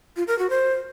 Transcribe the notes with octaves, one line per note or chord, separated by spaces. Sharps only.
F4
A#4
F#4
C5